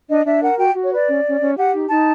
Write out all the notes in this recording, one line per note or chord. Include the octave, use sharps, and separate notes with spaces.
D4 D#5
D4 E5
A#4 F#5
F#4 G5
F#4
C#5
B4 D5
C#4
C#4
C#4
G4 F#5
D#4
D#4 A5